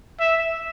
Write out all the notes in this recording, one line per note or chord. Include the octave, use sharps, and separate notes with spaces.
E5